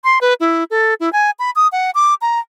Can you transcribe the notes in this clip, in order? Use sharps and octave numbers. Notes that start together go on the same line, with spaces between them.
C6
B4
E4
A4
E4
G#5
B5
D#6
F#5
D6
A#5